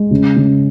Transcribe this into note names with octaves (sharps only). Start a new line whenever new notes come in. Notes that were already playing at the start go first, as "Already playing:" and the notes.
Already playing: G#3
C#3
C#3